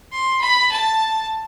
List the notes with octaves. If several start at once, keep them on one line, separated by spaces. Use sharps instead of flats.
C6
B5
A5